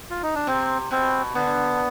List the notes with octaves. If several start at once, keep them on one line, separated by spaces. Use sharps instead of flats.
F4
D#4
D4
C3 C4
B2 C4
D3 B3